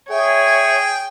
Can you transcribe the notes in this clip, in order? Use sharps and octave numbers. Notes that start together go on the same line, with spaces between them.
G#4 C#5 E5 G5 G#5